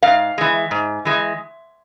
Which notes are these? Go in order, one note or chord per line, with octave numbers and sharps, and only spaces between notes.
G#2 F5
E3 G#3
G#2
E3 G#3